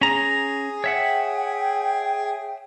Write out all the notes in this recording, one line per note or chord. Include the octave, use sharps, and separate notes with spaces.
C#4 G#4 A#5
C#5 E5 F#5 G5